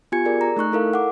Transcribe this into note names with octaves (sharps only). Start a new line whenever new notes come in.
B3 F4 G4 G#5 G#6 C#7
G#4 A#4 D5
A#5
A3 D#4 C#6 F#6
E4 A4 A#4 F5
F#5 D6